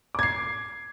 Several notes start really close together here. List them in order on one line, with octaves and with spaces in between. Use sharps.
D6 G#6 C7